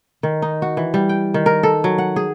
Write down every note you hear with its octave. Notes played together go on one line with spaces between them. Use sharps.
D#3
D#4
F#4
E3
G3
G5
D#3
A#4
A4
F#3
F#5
G#4